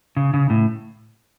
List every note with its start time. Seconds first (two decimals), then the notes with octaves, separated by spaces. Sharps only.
0.17 C#3
0.34 C#3
0.50 A2